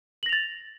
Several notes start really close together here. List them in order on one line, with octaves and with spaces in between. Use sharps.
F#7 A#6 F7 A6